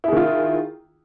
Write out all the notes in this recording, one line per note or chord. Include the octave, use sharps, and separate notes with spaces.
D#3 E4 F4 G#4